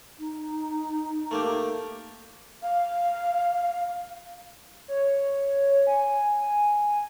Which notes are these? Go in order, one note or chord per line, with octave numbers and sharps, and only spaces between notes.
D#4
A3 A#3 G4
F5
C#5
G#5